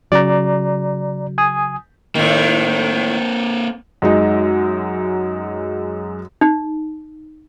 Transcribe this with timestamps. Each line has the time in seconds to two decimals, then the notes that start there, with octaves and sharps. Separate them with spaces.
0.12 C#3 F#3 D5 A#5
1.38 G#5 D#6
2.15 A2 D#3 A#3 C4
4.02 F#2 G#3 D#4
6.41 D#4